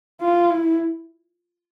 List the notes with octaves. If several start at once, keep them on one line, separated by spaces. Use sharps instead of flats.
F4
E4